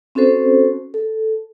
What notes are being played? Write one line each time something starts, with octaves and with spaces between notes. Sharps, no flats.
C4 C#4 F#4 A4 C5
A4